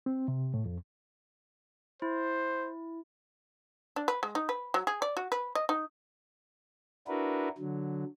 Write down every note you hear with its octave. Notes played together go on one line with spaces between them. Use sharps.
C4
C3
A2
F2
E4 C5
D4
B4
G#3
D#4
B4
F#3
G#4
D5
F#4
B4
D#5
D#4
D4 E4 F#4 A#4 B4
D3 F#3